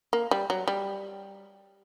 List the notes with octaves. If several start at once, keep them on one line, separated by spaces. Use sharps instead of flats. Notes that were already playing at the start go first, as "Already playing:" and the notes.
A#3
G3
F#3
G3